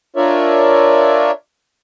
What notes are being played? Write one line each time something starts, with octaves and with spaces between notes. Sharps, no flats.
D4 F4 A#4 C#5 D5 E5